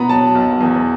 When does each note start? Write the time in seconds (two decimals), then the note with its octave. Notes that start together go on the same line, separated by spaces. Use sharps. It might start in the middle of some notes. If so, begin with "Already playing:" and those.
Already playing: B2 B3 A#5 B5
0.09 F#3 A5
0.35 B1
0.61 E2